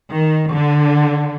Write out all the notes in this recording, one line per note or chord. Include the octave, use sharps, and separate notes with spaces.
D#3
D3